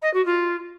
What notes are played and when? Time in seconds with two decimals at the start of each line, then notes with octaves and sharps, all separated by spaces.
0.02 D#5
0.13 F#4
0.25 F4